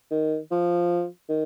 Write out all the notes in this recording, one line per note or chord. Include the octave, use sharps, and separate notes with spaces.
D#3
F3
D#3